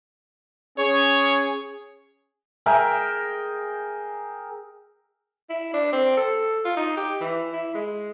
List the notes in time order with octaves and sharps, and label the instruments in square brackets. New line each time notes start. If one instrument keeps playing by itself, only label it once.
[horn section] C#4 G#4 [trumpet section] C#5
[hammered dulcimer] G#4 A#4 E5 G5
[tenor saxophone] E4
D4
C4
A4
F4
D#4
G4
E3
E4
G#3